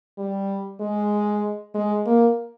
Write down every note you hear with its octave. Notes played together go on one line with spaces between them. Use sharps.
G3
G#3
G#3
A#3